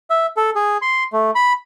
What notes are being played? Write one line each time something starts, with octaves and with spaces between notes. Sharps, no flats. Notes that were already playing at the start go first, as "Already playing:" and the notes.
E5
A4
G#4
C6
A3
B5